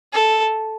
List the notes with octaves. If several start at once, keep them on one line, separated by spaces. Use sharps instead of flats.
A4